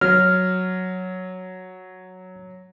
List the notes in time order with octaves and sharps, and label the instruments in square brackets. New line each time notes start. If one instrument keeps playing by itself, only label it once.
[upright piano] F#3 [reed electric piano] F6